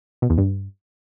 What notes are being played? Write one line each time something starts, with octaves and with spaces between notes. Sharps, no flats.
B2
E2
G2